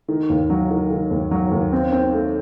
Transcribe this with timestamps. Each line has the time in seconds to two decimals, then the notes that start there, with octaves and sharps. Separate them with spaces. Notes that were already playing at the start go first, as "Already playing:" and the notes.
0.08 D#3
0.29 D#2
0.50 F#3
0.70 D#3
0.90 D#3
1.11 D#2
1.31 F#3
1.51 D#2
1.72 C4
1.92 C4
2.13 A3